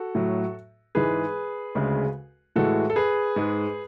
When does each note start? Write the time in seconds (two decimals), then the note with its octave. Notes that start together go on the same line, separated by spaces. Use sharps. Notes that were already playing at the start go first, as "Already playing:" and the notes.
Already playing: F#4 A4
0.15 A2 F#3
0.95 G#2 E3 G#3 G#4 B4
1.75 D2 C#3 G#3
2.56 A2 E3 G#3 F#4 A4
2.90 A4
2.96 G#4 B4
3.36 G#2 G#3